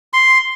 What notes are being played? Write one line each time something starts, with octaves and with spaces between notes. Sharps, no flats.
C6